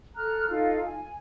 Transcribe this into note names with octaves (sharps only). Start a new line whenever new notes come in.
A4 A#5 F6 F#6
D#4 F4 A4 F5
G#5